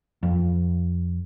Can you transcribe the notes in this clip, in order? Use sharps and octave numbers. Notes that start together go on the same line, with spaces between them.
F2